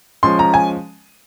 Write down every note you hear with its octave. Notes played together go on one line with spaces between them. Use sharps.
F3 G#3 C#4 C6
A#5
G#5